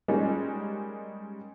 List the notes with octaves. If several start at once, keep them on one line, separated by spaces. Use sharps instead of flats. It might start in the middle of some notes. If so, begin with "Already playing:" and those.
G3 G#3 A#3 C#4 D#4